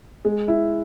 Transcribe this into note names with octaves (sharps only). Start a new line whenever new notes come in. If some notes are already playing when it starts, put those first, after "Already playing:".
G#3
E4